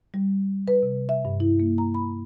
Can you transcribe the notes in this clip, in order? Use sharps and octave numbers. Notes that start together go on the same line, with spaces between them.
G3
B4
C3
E5
G2
E4
A#3
A#5
B5